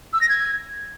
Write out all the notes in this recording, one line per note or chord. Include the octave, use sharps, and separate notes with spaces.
E6
A#6
G#6